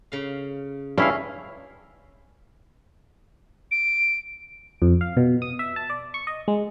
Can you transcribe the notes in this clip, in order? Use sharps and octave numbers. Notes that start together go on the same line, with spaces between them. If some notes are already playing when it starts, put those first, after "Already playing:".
C#3 F5
G2 G#3 C#4 E4 G#4 F5
D7
F2
F5
B2
D#6
E5
A5
D5
C#6
D#5
G#3